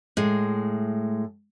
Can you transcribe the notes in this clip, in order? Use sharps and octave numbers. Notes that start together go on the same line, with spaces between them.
A2 G#3